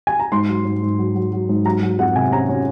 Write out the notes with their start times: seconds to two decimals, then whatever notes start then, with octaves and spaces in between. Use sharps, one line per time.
0.07 G#5
0.19 A#5
0.32 G#2 C6
0.49 F#3
0.65 G#2
0.82 G#2
0.98 F#3
1.15 F#3
1.33 F#3
1.49 G#2
1.65 F#3 A#5
1.82 F#3
1.99 F2 F#5
2.15 C3 G#5
2.32 C#4 A#5
2.49 C#4